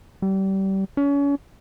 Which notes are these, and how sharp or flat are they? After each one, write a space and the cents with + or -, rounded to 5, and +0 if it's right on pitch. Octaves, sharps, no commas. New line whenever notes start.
G3 -25
C#4 +35